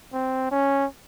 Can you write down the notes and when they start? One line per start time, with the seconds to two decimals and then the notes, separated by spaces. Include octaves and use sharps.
0.13 C4
0.51 C#4